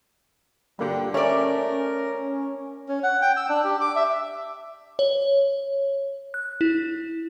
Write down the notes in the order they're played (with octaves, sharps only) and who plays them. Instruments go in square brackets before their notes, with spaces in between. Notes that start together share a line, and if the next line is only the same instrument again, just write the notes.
[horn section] G2 A#2 D3 [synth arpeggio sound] G3 A#3 G4
[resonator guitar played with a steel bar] A3 D5 [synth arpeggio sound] C#4 [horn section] A#4
[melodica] C#4
F#5
G5
E6
D4
G4
D6
E5
[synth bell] C#5
F#6
E4